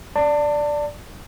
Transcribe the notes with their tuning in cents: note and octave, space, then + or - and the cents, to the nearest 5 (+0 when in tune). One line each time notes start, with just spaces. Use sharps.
D5 +0 A5 +30